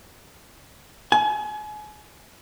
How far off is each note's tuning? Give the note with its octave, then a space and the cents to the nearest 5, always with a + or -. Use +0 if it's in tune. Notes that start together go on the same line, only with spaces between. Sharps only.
G#5 +35